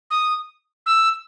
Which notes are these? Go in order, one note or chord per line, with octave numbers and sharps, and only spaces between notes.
D#6
E6